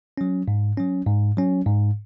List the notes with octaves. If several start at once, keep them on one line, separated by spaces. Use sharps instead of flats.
F#3 C#4
G#2
F#3 C#4
G#2
F#3 C#4
G#2